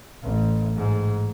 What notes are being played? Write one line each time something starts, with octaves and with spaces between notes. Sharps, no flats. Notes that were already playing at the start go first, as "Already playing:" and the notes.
A1
G#2